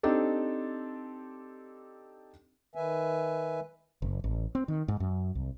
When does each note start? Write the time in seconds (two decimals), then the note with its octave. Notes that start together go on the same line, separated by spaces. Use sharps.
0.03 C4 D4 D#4 G4 A4
2.75 D#3 B4 E5 G#5
4.02 F#1
4.24 A1
4.55 C4
4.68 D#3
4.88 G#2
5.00 F#2
5.35 C2